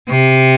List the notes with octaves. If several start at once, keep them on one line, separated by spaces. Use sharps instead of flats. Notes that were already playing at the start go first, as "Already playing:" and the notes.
C3